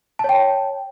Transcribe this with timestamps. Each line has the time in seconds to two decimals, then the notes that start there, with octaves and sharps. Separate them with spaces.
0.19 A5
0.24 C#5
0.29 G5